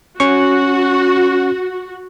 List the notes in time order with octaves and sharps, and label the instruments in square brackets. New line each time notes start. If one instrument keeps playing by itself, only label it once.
[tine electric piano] C#4 C#6 [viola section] F#4